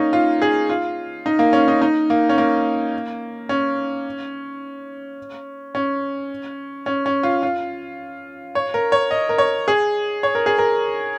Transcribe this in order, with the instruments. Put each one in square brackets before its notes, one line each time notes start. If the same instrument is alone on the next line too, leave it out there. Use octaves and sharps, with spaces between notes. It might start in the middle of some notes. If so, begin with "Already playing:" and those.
Already playing: [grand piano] A#3 C#4 D#4
F4
G#4
F4
D#4
A#3
C#4
D#4
D#4
A#3
C#4
A#3
C#4
C#4
C#4
C#4
F4
F4
C#5
A#4
C#5
D#5
A#4
C#5
G#4
C#5
A#4
G#4
A#4